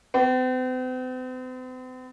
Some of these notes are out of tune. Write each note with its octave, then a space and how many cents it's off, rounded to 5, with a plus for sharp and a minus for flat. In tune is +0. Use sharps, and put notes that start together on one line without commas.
C4 -45